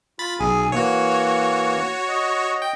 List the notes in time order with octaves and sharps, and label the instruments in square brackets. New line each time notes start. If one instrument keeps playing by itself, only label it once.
[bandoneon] F4 [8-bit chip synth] B5 A6
[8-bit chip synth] B1 [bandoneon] G#4 G#5
[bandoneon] E3 A#3 [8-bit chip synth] F#4 C#5
[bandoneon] D#5
[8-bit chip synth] G5